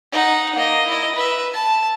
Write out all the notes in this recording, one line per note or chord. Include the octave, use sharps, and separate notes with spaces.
D#4 F#5
A#3 D#5
E4 D#5
B4 E5
A5